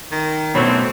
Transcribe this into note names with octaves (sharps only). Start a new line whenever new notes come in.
D#3
F#2 B2 E3 A3 C4 D4 C#5 B5